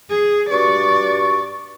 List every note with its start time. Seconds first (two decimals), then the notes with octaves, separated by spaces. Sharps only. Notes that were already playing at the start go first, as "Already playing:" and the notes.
0.11 G#4
0.50 G2 F#4 D5 C#6